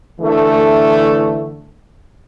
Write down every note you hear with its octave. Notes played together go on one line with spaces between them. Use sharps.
D3 E3 A3